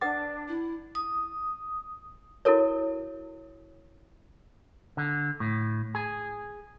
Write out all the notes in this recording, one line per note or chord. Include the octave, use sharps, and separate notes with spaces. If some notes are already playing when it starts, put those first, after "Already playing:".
D4 B4 F#5 D6 A6
E4
D#6
E4 F#4 A4 A#4 C#5
D3
A2
G#4